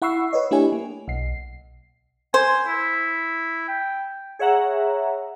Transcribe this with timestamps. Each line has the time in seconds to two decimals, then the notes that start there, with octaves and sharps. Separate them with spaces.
0.02 E4 F#5 B5 C#6 E6 C7
0.33 B4 C#5 D#5
0.51 A3 D4 E4 G4 C#5 G#5
0.72 A#3
1.08 B1 C7
2.34 C5 G#5
2.67 E4
3.68 G5
4.39 G#4 C#5 E5 F#5 A#5